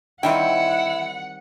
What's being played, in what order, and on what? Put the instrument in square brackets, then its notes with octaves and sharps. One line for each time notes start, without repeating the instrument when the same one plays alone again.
[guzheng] D#3 G3 C4 [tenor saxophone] E4 [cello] F#5 [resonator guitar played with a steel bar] G5